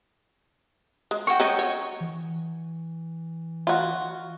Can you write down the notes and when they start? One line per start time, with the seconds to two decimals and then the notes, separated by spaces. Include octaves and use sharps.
1.11 G#3
1.27 F#4 G5 C#6
1.40 G#3 C#4 D#4
1.59 C#5
2.01 E3
3.67 F4 F#4